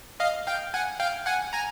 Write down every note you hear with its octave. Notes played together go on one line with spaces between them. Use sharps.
D#5 F5
F5 G5
F#5 G#5
F5 G5
F#5 G#5
G#5 A#5